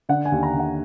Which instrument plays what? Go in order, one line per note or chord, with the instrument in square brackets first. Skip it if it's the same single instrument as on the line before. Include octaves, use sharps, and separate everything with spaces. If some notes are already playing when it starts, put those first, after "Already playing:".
[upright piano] D3 F#5
G#5
D#2
A#5
D3
F#5